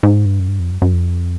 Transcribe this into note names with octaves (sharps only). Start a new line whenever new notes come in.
G#2
G2
F#2
G2
F2
F#2
F#2
F2